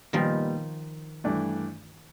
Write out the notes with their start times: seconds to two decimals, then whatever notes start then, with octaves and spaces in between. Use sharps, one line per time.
0.13 A#2 D#3 F3 G3 B3 D#4
1.24 G2 E3 A3 D4